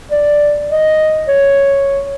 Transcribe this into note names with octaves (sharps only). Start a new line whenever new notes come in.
D5
D#5
C#5